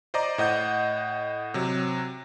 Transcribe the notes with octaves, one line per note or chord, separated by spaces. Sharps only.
C5 D5 D#5 A#5 D6
A2 D#5 F#5 G6
C3 F#3